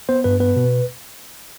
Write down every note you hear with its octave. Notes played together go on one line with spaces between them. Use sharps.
B3 C5
G2 B4
B3 B4
B2